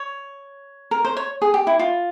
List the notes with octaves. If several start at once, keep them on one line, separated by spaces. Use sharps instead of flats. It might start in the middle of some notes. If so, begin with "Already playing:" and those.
Already playing: C#5
A#4
C5
C#5
G#4
G4
E4
F4